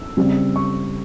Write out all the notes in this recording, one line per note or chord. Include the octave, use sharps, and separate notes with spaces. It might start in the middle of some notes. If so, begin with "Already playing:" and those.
Already playing: E6
C#3 G3 C4
C#6